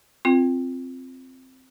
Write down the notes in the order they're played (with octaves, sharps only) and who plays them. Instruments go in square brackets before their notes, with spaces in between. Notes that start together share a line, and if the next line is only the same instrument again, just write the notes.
[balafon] C4 F4